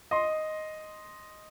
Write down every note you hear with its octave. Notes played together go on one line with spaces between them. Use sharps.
D#5 C6